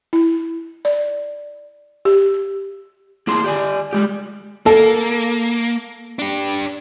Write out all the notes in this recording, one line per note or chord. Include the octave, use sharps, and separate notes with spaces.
E4
D5
G4
A#3 E4 G#4 A5 C6
G4 D5 G#5
G3 G#3 G4
A#3 A4
D4 G4